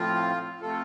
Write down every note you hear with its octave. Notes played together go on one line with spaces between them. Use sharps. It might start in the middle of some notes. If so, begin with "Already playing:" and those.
Already playing: A2 F3 C4 F4
C3 F3 A3 C4 F4 A4